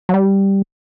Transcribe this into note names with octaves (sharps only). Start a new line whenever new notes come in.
F#3
G3